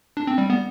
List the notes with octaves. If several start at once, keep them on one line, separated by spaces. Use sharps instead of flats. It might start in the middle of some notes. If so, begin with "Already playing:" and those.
D4
C4
G3
B3